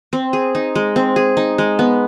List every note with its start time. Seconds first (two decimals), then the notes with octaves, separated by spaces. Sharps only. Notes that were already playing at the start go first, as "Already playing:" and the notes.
0.13 C4
0.33 G#4
0.55 D#4
0.75 G#3
0.96 C4
1.16 G#4
1.37 D#4
1.58 G#3
1.79 B3